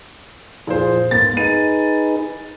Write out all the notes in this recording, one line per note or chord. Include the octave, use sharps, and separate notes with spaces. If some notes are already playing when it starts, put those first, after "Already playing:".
A#2 F3 G#4 C5
G#2 A#3 B3 A6
D#4 G#4 B4 D#7